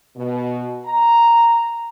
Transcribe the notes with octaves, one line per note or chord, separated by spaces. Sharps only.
B2
A#5